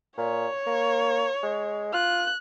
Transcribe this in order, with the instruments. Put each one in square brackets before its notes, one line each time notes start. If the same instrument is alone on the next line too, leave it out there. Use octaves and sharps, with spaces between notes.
[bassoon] A#2 [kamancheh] C#5
[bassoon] A#3
G#3
[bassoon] F4 [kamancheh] F#6